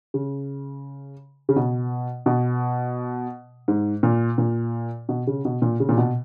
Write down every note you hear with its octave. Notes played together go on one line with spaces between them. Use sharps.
C#3
C#3
B2
B2
G#2
A#2
A#2
B2
C#3
B2
A#2
C#3
A#2
B2